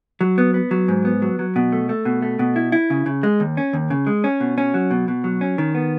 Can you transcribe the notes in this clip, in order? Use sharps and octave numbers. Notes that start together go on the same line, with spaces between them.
F#3
B3
B3
F#3
G#2
B3
F#3
F#3
B2
A3
A3
B2
A3
B2
E4
E4
C#3
C#3
G#3
D#2
C#4
D#2
C#3
G#3
C#4
B2
C#4
F#3
B2
B2
F#3
C#4
D#3
B3